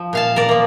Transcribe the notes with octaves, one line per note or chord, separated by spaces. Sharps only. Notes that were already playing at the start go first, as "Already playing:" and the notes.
Already playing: F3
A#2 F5 A5
A#4 D5
F3 A#3